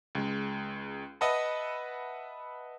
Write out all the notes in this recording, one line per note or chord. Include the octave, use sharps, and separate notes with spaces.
C#2 G#3
B4 D#5 E5 F#5 A5 B5